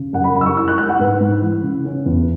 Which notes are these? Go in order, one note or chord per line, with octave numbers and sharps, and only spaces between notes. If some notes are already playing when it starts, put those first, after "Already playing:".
Already playing: C#3
F#2 F#5
B5
F#2 B5
E6
C#6
E4 E6
F#6
G#3 F#6
F#5
G#2 B4
G#2
E3
C#3
C#4
E2